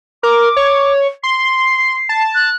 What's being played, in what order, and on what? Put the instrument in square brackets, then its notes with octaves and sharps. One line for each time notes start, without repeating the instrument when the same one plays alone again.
[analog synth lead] A#4 [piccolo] D6
[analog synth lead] C#5
[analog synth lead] C6 [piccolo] C7
[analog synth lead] A5
[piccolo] F#6